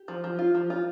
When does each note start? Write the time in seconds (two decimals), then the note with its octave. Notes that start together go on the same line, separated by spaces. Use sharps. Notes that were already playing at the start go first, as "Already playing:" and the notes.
Already playing: G4
0.08 F3
0.24 F3
0.39 F4
0.54 F3
0.70 F4